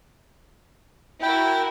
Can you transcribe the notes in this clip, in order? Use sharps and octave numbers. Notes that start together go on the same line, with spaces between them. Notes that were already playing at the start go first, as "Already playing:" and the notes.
E4 F#4 A#4 G5